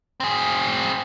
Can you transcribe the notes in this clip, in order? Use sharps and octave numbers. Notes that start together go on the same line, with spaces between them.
C4 G#4